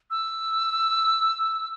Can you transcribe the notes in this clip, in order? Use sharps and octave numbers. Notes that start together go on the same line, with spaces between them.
E6